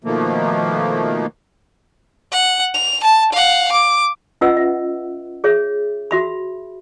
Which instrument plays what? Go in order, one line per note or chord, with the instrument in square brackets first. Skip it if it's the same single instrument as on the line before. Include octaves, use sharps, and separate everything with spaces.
[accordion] B2 D#3 F3 A3 A#3
[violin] F#5
F7
A5
F5 F#5
D6
[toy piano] C#4 F4 B4 D#5 F#5 E6
E5
G#4 C#5 E5
F#4 E5 B5